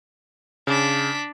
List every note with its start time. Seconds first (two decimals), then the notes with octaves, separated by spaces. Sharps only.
0.67 C#3 D4 B6